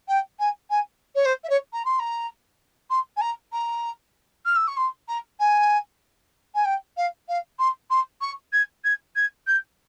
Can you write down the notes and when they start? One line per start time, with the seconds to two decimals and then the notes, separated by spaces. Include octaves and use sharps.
0.08 G5
0.40 G#5
0.70 G#5
1.15 C#5
1.25 C5
1.44 E5
1.50 C#5
1.73 A#5
1.85 C6
1.99 A#5
2.90 C6
3.17 G#5
3.21 A#5
3.52 A#5
4.45 F6
4.56 E6
4.68 C#6
4.77 C6
5.08 A#5
5.40 G#5
6.55 G#5
6.65 G5
6.97 F5
7.29 F5
7.59 C6
7.90 C6
8.21 C#6
8.53 G#6
8.84 G#6
9.16 G#6
9.47 G6